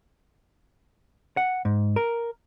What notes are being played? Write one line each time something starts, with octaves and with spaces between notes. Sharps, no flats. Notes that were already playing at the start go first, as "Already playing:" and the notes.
F#5
G#2
A#4